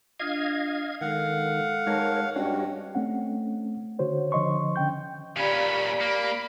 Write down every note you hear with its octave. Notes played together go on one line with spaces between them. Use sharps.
D4 F4 D#5 F5 G#6
D#3 G#3 A4 F5 F#5
G#2 A#4 C#5 A5
G2 G3 C#4 F#4 D#5 G5
A3 C4 C#4 F#5
D3 F#4 C5 C#5
D3 F3 D#5 C6 C#6
D3 C#4 G5 G6
A#2 C#4 G4 D5 F5 A#5 B5
A#3 B5